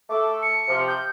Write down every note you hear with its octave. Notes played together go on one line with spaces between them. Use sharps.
A3 A4 D6
C#7
C3 F3
G6